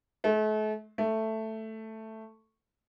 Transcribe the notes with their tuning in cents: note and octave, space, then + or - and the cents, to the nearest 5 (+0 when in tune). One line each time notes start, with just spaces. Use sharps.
A3 -40
A3 +5